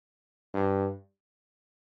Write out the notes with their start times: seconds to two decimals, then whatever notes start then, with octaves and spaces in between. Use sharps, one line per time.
0.54 G2